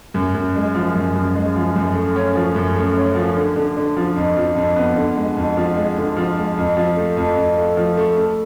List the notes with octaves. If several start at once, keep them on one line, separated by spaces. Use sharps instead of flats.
F#2
F#2
G#3
F3
F#2
F#2
G#3
F3
F#2
A3
C#4
F3
F#2
A3
C#4
F3
D3
D3
D3
F3
F2
F3
F2
B3
D3
G#3
F2
F3
G#3
D3
F3
G#3
F2
F3
A3
F2
F2
A3
F3
A3
A3